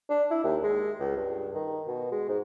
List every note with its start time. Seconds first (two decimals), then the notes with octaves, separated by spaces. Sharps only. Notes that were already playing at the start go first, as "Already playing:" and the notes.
0.10 D4
0.31 E4
0.44 D#2
0.63 G#3
0.99 C#2
1.17 G2
1.54 D#3
1.87 B2
2.12 G#3
2.29 G#2